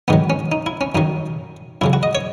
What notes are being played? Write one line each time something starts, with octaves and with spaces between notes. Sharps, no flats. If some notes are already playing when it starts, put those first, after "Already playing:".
G#2 D#3 F#3 B3
C#4
D#4
E4
C#4
F#2 D#3 F#3 D#4
F#2 C#3 F#3 E4
F#4
D#5
C#5